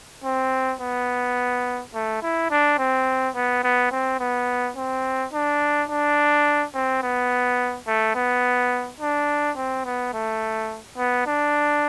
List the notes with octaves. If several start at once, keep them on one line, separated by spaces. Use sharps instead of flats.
C4
B3
A3
E4
D4
C4
B3
B3
C4
B3
C4
D4
D4
C4
B3
A3
B3
D4
C4
B3
A3
B3
D4